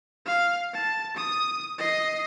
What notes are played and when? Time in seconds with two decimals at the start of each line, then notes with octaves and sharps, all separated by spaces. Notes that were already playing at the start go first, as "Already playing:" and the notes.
0.26 F5
0.74 A5
1.16 D#6
1.79 D#5 C7